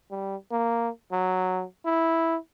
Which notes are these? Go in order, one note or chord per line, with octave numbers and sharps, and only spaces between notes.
G3
A#3
F#3
E4